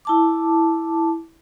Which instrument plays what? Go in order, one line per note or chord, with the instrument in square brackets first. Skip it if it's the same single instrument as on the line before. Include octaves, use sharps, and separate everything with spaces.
[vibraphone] E4 A5 D6